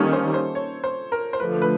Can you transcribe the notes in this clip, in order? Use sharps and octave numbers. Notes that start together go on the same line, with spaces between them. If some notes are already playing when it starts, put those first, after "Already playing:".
Already playing: D#3 G3 A#3 C#4 A4
C5
C5
C#5
C5
A#4
C5
D3 F3 A3 B4
B4